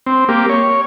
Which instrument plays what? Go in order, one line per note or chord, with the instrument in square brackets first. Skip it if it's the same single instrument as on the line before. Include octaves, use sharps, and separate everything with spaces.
[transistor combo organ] C4
A#3 G4
C#5